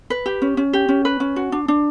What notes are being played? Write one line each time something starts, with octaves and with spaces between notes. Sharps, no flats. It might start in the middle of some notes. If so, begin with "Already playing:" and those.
B4
G4
C#4
C#4
G4
C#4
B4
C#4
F#4
D4
D4